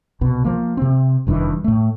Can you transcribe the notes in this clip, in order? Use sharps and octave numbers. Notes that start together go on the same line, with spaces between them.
C2 B2
F3 A#3
C3 C4
F1 G2 D#3 E3
A2 A3